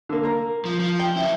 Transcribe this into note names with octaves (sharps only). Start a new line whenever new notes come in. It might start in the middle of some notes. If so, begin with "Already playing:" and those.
D3 A#3
A#3 A#5
F3
F3
G5
F#3 E4